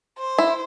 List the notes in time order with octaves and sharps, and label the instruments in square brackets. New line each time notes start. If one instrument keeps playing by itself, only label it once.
[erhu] C5
[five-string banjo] E4